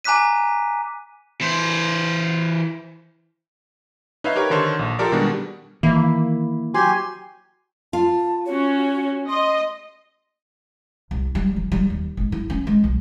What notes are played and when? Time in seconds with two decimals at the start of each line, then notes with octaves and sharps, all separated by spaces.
0.04 G#5 A#5 D6 F#6 B6 D#7
1.41 E3 C5
4.24 D#4 B4 C#5 E5 F5
4.36 G4 A#4 B4 C#5
4.50 D3 D#3 A4 C5 C#5
4.79 A#1
4.99 F4 G4 A4 A#4 D5
5.12 B2 D#3 G3 G#3 D4 F#4
5.83 D#3 E3 A#3 E4
6.74 F#3 G4 G#5 C6
7.93 F4 A5
8.46 C#4 F#4 C#5
9.29 D#5 C6
11.11 C2
11.35 G3
11.56 F3
11.72 G3
11.90 D#2
12.17 G#1
12.32 E4
12.50 C#4
12.67 G#3
12.84 B1